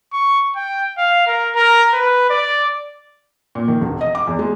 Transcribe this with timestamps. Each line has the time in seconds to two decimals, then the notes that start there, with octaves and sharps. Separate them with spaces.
0.13 C#6
0.56 G5
0.98 F5
1.27 A#4
1.55 A#4
1.94 B4
2.30 D5
3.55 A#2
3.68 D#3
3.81 E1
4.01 D#5
4.15 D6
4.27 E2
4.39 G#3